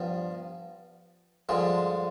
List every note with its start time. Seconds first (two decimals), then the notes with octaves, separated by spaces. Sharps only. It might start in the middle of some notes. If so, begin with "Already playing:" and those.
Already playing: G2 F3 B3
1.49 G2 D3 F3 G#3